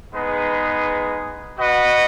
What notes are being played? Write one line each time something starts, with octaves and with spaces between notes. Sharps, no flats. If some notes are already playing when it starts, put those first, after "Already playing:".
G#3 B3 D#4 G#4 B4
F#4 B4 D#5 F#5